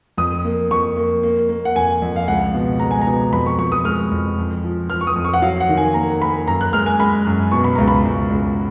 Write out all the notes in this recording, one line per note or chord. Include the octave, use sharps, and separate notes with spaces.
F2 D#6
A#3
F2 C#6
A#3
A#3
A#3
F#5
F2 G#5
F2
F5
C#2 F#5
B2
G#3 A#5
G#5
A#5
B2
F2 B5
C#6
F2 C#6
D#6
G#3 F6
F2
F2
F3
F3 F6
C#6
D#6
F2
C#6
F#5
F#3 F5
F#5
D#3
G#5
A#3 A#5
A#3 B5
F#2 A#5
F#6
G#3 F6
G#5
G#3 B5
F#2
B2 C#6
B5
C#2 A#5
B5
C#2
C#2